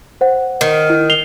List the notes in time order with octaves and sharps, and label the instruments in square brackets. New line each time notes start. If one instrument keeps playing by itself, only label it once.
[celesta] C5 F#5
[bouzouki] D#3
[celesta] E4
C7 F7 G7